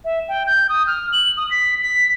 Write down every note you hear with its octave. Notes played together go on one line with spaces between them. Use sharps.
E5
G5
G6
D#6
F6
F#7
D#6
B6
B6